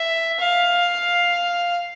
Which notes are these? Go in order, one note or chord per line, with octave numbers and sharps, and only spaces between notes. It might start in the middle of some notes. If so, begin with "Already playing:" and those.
Already playing: E5
F5